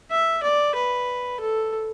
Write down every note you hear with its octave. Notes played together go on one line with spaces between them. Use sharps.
E5
D5
B4
A4